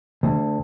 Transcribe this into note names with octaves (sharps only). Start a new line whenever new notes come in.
D2